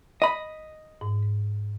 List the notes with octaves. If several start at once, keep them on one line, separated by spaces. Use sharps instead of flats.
D#5 B5
G#2